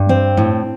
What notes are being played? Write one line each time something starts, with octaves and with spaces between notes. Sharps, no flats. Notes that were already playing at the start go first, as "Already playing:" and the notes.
Already playing: G2
C4
A2